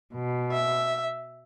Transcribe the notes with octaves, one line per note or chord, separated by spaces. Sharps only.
B2
E5